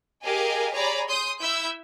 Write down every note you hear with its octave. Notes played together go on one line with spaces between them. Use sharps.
G4 G#4 A#4 D#5 F5 G#5
G#4 C#5 D5 A#5 B5
C6 D#6 G6
E4 E5 E6 G6